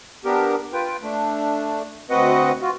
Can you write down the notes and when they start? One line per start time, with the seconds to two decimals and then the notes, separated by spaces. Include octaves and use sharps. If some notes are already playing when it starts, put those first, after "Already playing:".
0.25 B3 D4 G4 A#4
0.73 F4 B4 G5
1.03 A3 D4
2.10 D2 C4 F#4 B4 D#5 F#5
2.61 F4 F#4